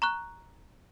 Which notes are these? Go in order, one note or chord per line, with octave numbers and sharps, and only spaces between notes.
A#5 C#6 F#6